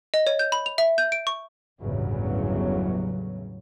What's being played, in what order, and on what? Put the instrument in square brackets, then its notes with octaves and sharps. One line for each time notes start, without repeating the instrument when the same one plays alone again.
[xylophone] D#5
C#5
G6
B5
F7
E5
G6
D7
C#6
[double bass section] G1 E2 A2 C#3 F#3